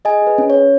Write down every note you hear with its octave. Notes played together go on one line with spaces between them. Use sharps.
G#4 D#5 G#5
G#4 B4
C#4
C#4 C#5